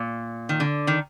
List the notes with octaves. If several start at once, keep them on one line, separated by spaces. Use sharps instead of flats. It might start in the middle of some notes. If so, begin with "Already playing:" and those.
Already playing: A#2
D#3
D3
D#3